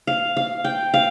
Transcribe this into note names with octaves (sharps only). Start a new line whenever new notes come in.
F5
F5
G5
F5